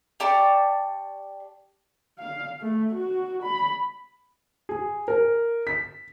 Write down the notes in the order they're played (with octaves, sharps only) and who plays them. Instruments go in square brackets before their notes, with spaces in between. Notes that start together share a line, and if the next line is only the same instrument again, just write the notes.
[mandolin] G4 D5 A5 C#6
[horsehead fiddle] F5
A3
F#4
B5
[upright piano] G#4
A#4
B6